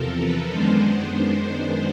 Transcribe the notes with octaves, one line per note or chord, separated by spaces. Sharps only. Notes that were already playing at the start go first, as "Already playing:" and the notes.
Already playing: E2 C3 F3 A4 A#4
B4
F#2 D#3 G#3 B3 D4 C5